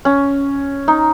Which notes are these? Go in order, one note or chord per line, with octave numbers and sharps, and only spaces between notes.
C#4
D#4